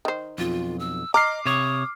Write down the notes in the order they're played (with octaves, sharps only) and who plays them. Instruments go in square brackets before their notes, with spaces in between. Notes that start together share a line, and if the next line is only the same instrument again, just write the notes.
[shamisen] D#3 C5
[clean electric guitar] B1 F2 [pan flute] F4
[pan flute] E6
[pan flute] D#5 [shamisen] A#5 [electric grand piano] D6 F6 C7
[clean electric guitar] C3 C#5 [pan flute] D#6